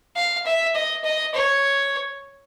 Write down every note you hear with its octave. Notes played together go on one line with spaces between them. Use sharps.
F5
E5
D#5
D#5
C#5